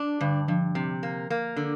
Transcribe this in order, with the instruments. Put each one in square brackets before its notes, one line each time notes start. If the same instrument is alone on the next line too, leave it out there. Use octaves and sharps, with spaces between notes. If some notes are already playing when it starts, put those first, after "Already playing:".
Already playing: [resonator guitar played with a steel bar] D4
[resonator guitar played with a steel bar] G2 [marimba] D3
[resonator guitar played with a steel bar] G2 [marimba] F3
[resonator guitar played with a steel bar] C3
A#3
A#3
D3